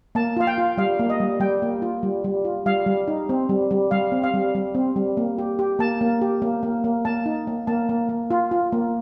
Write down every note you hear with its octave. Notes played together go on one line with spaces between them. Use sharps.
A#3 A5
F4 F5
G5
F4
G3 F5
A#3
D#5
G3
G3 G5
A#3
F4
G3
G3
F4
G3 F5
G3
D#4
C4
G3
G3
G3 F5
C4
F5
G3
G3
C4
G3
A#3
G4
G4
A#3 A5
A#3
G4
A#3
A#3
A#3
A#3 A5
D#4
A#3
A#3 A5
A#3
A#3
F4
F4
A#3